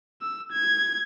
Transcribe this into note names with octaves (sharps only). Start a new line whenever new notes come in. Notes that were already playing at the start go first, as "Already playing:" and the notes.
E6
G#6